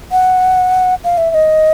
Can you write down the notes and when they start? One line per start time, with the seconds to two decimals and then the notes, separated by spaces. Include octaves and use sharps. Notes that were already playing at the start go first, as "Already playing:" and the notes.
0.12 F#5
1.04 F5
1.18 E5
1.31 E5
1.34 D#5